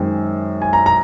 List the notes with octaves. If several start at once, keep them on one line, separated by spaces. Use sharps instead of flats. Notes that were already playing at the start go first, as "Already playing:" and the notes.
Already playing: F#2 D#3 G#3 C4
G#5
A#5
A#5